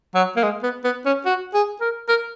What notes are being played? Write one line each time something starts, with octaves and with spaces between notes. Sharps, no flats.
F#3
A#3
G#3
B3
B3
C#4
F#4
G#4
A#4
A#4